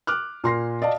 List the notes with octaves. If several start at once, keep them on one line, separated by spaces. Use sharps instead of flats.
D6 F6 F#6
A#2 C6 A#6 C7
D5 D#5 F5 A5